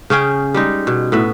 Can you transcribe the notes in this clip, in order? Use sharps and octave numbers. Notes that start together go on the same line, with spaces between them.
C#3 C#4 G#4 G5
G3 G#3 D#4
B2
A2 B3 E5